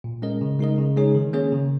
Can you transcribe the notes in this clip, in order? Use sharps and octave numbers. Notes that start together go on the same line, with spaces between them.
A#2
G#3 C#4 A#4 D#5
C#3
G#3 D#4 A#4 D#5
C#3
G#3 D#4 G#4 C#5
D#3
A#3 C#4 G#4 C#5
C#3